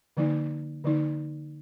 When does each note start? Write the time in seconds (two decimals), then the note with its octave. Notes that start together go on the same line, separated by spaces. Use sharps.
0.17 D3 F3 A#3 D#4
0.84 D3 F3 A#3 D#4